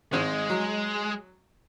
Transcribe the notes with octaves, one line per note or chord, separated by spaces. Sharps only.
G#1 G#3 C4 C5
F#3